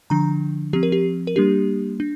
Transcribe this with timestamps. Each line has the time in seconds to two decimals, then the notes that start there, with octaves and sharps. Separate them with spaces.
0.10 D3 F3 D4 A#5
0.73 F3 C4 G4
0.83 A#4
0.92 G4
1.27 A#4
1.36 G3 A#3 D4 G4
2.00 D4